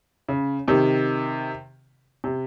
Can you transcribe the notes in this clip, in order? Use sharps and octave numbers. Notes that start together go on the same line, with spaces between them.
C#3
C3 D#3
C3